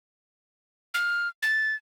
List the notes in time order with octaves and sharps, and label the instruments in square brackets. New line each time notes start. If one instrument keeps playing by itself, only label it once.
[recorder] F6
A6